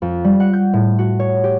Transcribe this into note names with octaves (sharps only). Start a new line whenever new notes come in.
F2
G3
F#5
G6
A2
F#4
C#5
G4